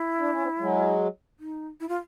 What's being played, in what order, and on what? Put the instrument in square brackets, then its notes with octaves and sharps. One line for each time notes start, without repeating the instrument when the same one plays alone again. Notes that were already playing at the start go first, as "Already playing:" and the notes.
Already playing: [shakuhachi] E4
[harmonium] D4
C#4
C4 D4
F#3 G#3
[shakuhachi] D#4
E4
F4